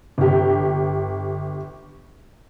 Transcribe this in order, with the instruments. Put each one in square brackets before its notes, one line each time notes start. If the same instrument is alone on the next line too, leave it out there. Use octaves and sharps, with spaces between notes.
[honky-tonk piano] G1 G4